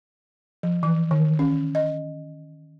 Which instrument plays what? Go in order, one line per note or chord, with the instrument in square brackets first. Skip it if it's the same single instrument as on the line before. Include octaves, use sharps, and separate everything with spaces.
[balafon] F3
E3
D#3
C#4
D#5